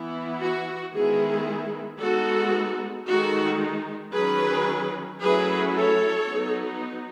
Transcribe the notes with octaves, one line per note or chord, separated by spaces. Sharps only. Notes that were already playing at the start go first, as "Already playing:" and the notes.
Already playing: E3 B3 E4
F#4
D#3 G#3 B3 E4 G#4
G#3 B3 D#4 F#4 A4
D#3 G#3 D#4 F#4 A4
D#3 F#3 C#4 G#4 B4
F#3 A3 C#4 E4 G#4 B4
A4 C#5
F#3 B3 D#4